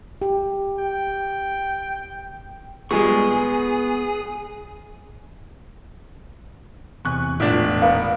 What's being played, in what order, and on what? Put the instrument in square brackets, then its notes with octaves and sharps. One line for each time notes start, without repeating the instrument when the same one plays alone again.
[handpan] G4
[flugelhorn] G5
[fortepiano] A#2 G3 G#3 [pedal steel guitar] B3 C#6 [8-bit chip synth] G#4 G#5
[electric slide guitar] E2 C3 G#5 [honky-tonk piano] C#6 F#6
[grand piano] E1 D4 [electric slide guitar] A2 [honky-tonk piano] F4 B6 E7
[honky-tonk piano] B3 A#4 [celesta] F5